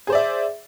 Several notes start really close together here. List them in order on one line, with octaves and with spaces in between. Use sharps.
G#4 C5 D5 E5